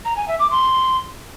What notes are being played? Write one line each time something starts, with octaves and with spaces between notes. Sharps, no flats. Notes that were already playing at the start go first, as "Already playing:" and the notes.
A#5
G#5
E5
D6
C6